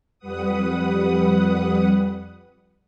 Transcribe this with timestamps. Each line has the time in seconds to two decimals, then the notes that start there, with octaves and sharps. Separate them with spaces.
0.19 F2 G3 B4 F#5 D#6